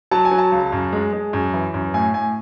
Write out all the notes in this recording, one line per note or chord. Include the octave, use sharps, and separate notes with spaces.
F#3 A5
G#5
F#3
A5
C#2
F#2
G#3
G#3
F#2
E3
F#2
A2 G#5
A2 G#5